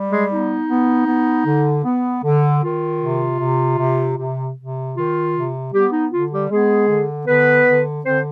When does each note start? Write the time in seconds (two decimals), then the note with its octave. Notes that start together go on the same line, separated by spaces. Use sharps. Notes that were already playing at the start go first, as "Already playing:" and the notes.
Already playing: G3
0.11 G#3 G#4
0.29 B3 D#4
0.69 B3
1.07 B3
1.46 D3
1.85 B3
2.23 D3
2.63 D#3 F4
3.01 C3
3.40 C3
3.79 C3
4.18 C3
4.57 C3
4.95 D#3 F4
5.34 C3
5.73 G3 B3 G4
5.92 D#4
6.12 D3 F4
6.31 G3 G4
6.50 G#3 B3 G#4
6.89 D3
7.27 D3 B3 B4
7.67 D3
8.05 D3 C4 C5